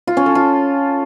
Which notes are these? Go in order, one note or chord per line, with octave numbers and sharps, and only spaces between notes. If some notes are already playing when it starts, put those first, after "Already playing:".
F4
C#4
A4
F4